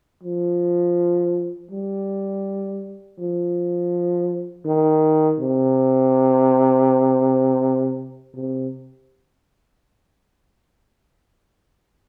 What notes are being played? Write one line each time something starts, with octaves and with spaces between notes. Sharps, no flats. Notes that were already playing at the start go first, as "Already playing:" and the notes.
F3
G3
F3
D#3
C3
C3